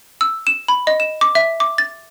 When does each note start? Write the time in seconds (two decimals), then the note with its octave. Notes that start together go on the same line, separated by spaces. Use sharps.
0.21 E6
0.47 E7
0.68 B5
0.87 D#5
1.00 E7
1.21 D6
1.35 E5
1.60 D6
1.78 A6